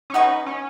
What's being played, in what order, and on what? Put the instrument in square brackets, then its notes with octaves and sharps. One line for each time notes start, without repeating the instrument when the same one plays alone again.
[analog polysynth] C#4
[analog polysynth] D#4 [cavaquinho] B4 D#5 F#5 C#6
[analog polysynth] C#4